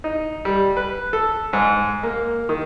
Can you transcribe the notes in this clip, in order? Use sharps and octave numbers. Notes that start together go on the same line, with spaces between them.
D#4
G3
B4
A4
G#2
A#3
D#3